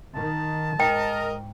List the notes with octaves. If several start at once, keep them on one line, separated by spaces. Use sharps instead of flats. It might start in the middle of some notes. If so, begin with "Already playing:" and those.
D#3 A5
G#2 A#4 D#5 G5